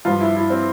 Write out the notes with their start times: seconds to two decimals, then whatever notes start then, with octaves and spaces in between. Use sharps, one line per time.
0.05 G2 F3 F4
0.20 E4
0.36 E4
0.50 C4